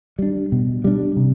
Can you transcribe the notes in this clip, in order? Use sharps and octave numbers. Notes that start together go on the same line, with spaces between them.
G3 D4
B2
G3 D4
C3